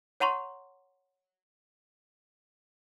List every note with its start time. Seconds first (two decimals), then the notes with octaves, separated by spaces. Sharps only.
0.20 C#5 F#5 A#5 C6 C#6